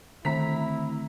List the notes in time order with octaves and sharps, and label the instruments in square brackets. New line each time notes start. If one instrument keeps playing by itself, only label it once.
[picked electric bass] D3 A3 C4 [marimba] D#3 [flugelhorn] E4 [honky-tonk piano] A#5 B6